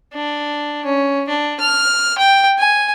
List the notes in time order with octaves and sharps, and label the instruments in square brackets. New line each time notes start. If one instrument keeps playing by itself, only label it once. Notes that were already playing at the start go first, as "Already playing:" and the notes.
[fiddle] D4
C#4
D4
F6
G5
G#5